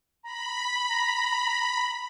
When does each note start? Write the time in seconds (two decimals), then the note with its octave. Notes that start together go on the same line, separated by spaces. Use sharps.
0.24 A#5 B5
0.89 A#5